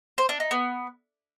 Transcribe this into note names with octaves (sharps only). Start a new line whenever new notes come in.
C5
D4
D#4
B3